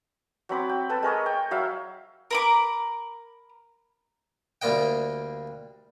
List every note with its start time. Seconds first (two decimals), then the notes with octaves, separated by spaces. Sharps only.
0.49 F#3 C4 B5 D6
0.69 G5
0.89 A4 B4 A5
1.03 G#3 A#4 C#5 D#5
1.26 G5
1.51 F#3 E5 F5 B5
2.31 A#4 B5 D6
4.62 D2 G3 A#3 D#5 G5